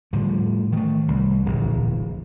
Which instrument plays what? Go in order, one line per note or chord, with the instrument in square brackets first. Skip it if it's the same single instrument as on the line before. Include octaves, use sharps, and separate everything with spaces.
[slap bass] A2 D3 F3 G3
D#3 A3
C2
D1 A#1 E2